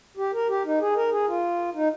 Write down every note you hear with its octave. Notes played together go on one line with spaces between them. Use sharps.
G4
A#4
G4
D#4
G#4
A#4
G#4
F4
D#4